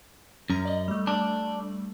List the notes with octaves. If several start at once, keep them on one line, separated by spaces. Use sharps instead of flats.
F#2 C#4 A#5
D5 D#5
G3 A3
D4